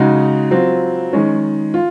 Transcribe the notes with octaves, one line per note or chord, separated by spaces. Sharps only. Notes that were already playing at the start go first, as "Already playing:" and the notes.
Already playing: C#3 G#3 D#4 F#4
F#3 C4 F4
D#3 G#3 C#4
F4